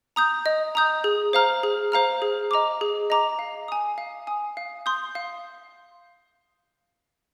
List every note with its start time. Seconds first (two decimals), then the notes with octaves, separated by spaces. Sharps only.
0.16 A#5 D#6 G6
0.46 D#5
0.75 A#5 D#6 G6
1.04 G#4
1.33 C5 F5 A#5 F6
1.63 G#4
1.92 C5 F5 A#5 F6
2.22 G#4
2.51 D#5 A#5 D6
2.81 G#4
3.10 D#5 A#5 D6
3.39 F5
3.68 G#5 D#6
3.98 F5
4.27 G#5 D#6
4.57 F5
4.86 C6 D#6 G6
5.15 F5